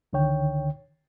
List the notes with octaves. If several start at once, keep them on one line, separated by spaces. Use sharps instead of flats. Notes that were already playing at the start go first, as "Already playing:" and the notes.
C#2 D3 D#3 C#5 G5